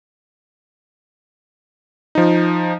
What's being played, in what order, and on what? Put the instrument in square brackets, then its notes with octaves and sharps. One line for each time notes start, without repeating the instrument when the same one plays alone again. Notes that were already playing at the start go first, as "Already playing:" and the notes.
[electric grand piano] F3 D#4